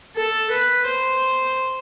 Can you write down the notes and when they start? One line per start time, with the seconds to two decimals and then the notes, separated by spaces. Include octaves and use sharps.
0.16 A4
0.51 B4
0.86 C5